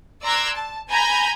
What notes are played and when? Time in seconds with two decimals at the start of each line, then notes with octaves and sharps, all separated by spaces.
0.23 D5 A#5 C6 E6 F#6 G#6
0.56 A5
0.90 G#5 A#5 B5 G6 G#6